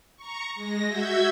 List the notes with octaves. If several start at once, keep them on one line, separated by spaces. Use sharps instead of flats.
A#5 C#6
G#3 A#6
F#4 E5 E6 G6 G#6